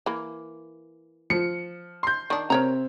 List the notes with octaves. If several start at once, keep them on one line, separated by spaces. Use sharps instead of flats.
E3 A#3
F3 C#7
C6 G6
D#3 D4
C3 C4 A#4 C#5 A#5